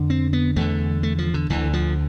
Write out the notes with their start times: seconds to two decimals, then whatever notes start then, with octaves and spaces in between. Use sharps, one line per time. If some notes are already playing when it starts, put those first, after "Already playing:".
Already playing: F2 D3
0.10 C4
0.33 B3
0.56 E2 D3 A3
1.03 A3
1.18 F3
1.34 D3
1.50 D2 D3 E3
1.73 F3